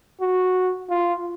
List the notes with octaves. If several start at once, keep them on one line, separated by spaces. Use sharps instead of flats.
F#4
F4